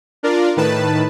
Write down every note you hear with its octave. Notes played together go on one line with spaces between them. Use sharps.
D4 F4 A#4 D5
A2 D#3 B4 A5